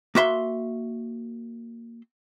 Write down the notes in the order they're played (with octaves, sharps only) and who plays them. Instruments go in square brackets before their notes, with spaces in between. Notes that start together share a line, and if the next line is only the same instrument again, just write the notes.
[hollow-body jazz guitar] A#3 F#4 E5 C6